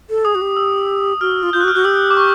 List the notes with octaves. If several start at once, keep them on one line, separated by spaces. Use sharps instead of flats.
A4
G#4 D#6
F#4
G4
E6
F#4 F6
F4
F4 G6
F#6
F#4
F6
F#4 F#6
G4 E6
D6
C#6